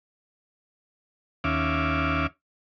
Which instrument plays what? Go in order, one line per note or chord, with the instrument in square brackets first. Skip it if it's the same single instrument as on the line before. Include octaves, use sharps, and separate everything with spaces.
[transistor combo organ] D#2 C#4 E5 F5 D6